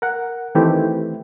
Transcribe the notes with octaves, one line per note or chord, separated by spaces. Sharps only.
A#4 F#5
D#3 E3 A3 C4 E4 G4